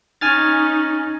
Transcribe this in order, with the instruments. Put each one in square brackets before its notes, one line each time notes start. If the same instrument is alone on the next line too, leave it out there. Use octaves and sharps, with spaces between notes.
[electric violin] C#4 D#4 [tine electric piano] G#5 F6 A6